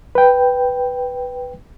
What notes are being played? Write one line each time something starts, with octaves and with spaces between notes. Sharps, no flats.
B4 G5